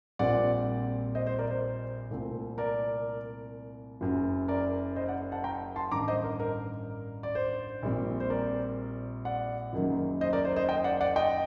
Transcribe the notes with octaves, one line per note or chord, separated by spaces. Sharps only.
A#1 A#2 G3 C4 D5 F#5
C5 D#5
C5
A#4 D5
C5
C2 A#2 A3 C4
A#4 D5
F#1 F#2 F#3
A#4 D5
C5 D#5
D5 F#5
F#5 A5
G5 A#5
A5 C6
A1 G2 D#3 A#5 D6
C5 D#5
A#4
A#4
D5
C5
A#1 A#2 G3 C4
C5
A#4 D5
D5 F#5
F#1 F#2 D#3 F#3 A#3
C5 D#5
A#4 D5
C5
C5 D#5
D#5 G5
D5 F#5
D5 F#5
D#5 G5